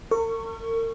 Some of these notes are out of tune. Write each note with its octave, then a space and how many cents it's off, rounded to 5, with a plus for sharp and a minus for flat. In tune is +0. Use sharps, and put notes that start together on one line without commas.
A#4 -45 C#6 +5